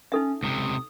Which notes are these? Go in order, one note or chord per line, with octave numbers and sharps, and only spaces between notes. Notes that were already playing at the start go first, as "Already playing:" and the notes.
C#4 D#4 A4 E5
C#2 C3 D#6